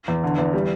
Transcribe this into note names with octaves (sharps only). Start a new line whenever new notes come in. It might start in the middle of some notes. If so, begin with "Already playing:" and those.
E2
D3
E2
G3